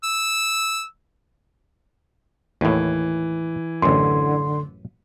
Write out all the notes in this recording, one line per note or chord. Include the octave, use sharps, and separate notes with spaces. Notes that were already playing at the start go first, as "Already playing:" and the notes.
E6
D#2 A2 E3
A1 F#2 D3 C6